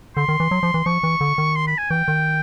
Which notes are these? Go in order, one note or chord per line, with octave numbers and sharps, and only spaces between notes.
D3 C6
D#3
E3
F#3
F3
E3
F3 C#6
E3
D3
D#3
C6
B5
G#5
E3 G5
D#3